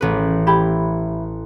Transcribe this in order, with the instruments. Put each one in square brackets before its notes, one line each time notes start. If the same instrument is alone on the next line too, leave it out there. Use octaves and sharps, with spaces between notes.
[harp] A1 B4
[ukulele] E4 G4 B5